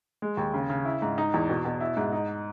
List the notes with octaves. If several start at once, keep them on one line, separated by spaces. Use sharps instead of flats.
G#3
D#2
C#3
C#3
E4
G#2
D#4
E2
B2
B2
E4
G#2
D#4